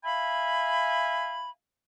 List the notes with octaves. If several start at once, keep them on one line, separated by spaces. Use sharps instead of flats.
E5 F5 G#5 B5